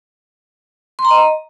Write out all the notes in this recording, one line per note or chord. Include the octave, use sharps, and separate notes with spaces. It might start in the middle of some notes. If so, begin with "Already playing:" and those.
C6
A#5
D#5